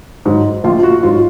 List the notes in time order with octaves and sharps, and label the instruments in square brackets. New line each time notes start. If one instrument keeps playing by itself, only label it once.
[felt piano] G#2 F#3
A#1 F4
F#4
G#2 F#3 F4